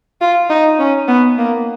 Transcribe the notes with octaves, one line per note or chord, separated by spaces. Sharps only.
F4
D#4
C#4
B3
A#3